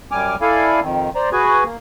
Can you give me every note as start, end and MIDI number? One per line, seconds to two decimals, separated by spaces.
0.12 0.36 42
0.12 0.36 55
0.12 0.36 80
0.12 0.36 86
0.12 0.36 89
0.41 0.80 64
0.41 0.80 69
0.41 0.80 74
0.41 0.80 77
0.41 0.80 80
0.82 1.10 41
0.82 1.10 51
1.15 1.29 72
1.15 1.29 74
1.15 1.29 82
1.32 1.64 66
1.32 1.64 68
1.32 1.64 71
1.32 1.64 80
1.65 1.77 58